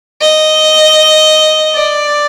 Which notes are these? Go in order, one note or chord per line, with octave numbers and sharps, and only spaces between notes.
D#5
D5